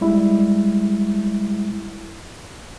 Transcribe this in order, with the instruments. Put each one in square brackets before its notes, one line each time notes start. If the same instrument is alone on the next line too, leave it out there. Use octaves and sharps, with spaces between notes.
[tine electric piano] G3 G#3 E4